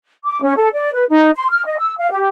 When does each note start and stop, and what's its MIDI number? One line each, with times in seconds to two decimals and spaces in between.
0.25 0.41 86
0.43 0.55 61
0.57 0.68 69
0.74 0.91 74
0.93 1.04 71
1.10 1.31 63
1.36 1.47 84
1.51 1.65 89
1.66 1.77 75
1.78 1.93 88
1.99 2.10 77
2.11 2.29 67